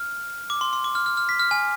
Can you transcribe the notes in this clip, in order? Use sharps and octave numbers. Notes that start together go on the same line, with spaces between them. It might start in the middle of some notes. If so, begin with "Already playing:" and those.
Already playing: F6
D6
C6
C6
D6
F6
F6
F6
B6
F6
G#5